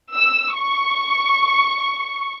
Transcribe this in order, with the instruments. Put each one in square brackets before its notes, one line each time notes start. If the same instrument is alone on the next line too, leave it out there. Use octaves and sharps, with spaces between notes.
[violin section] E6
C#6